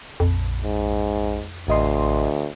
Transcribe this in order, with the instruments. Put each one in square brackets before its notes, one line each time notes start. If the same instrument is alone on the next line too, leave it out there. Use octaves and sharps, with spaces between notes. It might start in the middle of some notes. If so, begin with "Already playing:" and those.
[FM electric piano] A#1 [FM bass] F2
[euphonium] G#2
[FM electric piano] A1 D#5 C6 [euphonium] D2